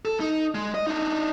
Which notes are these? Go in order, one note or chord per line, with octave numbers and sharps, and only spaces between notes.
A4
D#4
G#3
D#5
D4 D#4